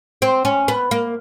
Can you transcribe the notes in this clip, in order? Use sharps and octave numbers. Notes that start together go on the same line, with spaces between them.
C4
C#4
B3
A#3